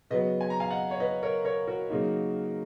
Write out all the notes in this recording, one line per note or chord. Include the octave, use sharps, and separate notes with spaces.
C#3 F#3 B3 B4 D#5
G#5
A#5
F5 G#5
D#5 F#5
C#5
B4 D#5
A#4 C#5
A#4 C#5
F#4 A#4
C#3 F#3 A#3 D#4